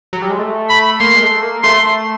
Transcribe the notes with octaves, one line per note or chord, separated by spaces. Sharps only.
F#3
G3
G#3
A3
B5
A#3 C6
G#3
A3
A#3
A3 C6